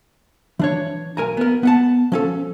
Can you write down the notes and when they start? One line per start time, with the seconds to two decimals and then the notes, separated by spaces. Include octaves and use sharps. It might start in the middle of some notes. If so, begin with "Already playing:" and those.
0.59 E3 D4 C#5
1.17 B1 A#4 G#5 A#5
1.37 B3 A#4
1.63 B3 F#5 A5
2.12 F3 C#4 A4